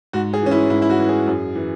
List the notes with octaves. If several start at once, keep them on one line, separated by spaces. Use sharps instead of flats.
G#2 F#4
G#4
E3 C#4
E4
G#2 E4
E4
F#4
E3
G#4
F#2
E3